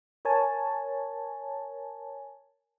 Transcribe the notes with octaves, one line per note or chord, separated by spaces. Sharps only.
A#4 C#5 G#5 A5